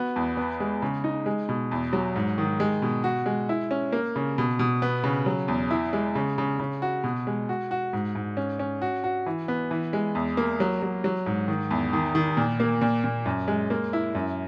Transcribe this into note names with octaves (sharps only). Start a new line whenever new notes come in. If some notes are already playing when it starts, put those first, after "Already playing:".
Already playing: B3 F#4
E2
B3
G#3
C#3
D#4
G#3
B2
E2
F#3
G#2
D#3
G#3
B2
F#4
G#3
E4
C#4
A#3
C#3
B2
B2
B3
C#3
F#3
E2
E4
G#3
C#3
C#3
C#3
F#4
B2
G#3
F#4
F#4
G#2
G#2
C#4
C#4
F#4
F#4
E3
B3
E3
G#3
E2
A#3
F#3
F#3
F#3
G#2
D#3
E2
D#3
D#3
A#2
A#3
A#2
A#2
F#2
G#3
A#3
E4
F#2